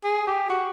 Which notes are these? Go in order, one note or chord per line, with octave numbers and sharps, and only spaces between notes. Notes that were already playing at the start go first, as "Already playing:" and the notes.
G#4
G4
F#4